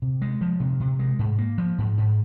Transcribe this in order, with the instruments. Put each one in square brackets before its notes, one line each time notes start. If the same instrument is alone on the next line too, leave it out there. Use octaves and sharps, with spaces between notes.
[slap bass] C3
G#3
F3
C3
C3
G#3
G#2
A#3
F3
G#2
G#2